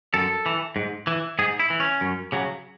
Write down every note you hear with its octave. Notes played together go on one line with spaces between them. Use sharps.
F#2 A4
E3
G#2
E3
G#2 G#4
E4
E3
C#4
F#2
C#3 F#3